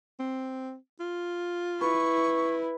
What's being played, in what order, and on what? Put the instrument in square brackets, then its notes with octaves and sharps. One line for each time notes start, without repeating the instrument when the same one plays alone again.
[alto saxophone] C4
F4
[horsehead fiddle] E4 [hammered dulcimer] B4 [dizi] C#6